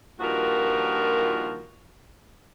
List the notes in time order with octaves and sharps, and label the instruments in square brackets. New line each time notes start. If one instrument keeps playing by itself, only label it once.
[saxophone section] G2 A#2 D#3 F3 F#4 A#4